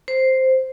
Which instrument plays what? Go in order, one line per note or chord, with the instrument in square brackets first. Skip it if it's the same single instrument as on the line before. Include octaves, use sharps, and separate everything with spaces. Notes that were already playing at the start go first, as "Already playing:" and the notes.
[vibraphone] C5